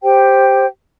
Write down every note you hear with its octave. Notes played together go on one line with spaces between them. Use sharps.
G4 C5 G5